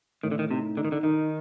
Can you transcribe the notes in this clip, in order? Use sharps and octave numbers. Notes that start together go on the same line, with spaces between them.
A2 D#3
D3
D#3
C3 D#4
D3 D#4
D#3
D3
D#3 D#4